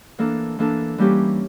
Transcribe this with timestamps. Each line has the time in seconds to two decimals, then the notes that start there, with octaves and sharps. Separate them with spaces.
0.18 E3 A#3 D4 A4
0.59 E3 A#3 D4 A4
0.98 E3 G3 A#3 C#4 G4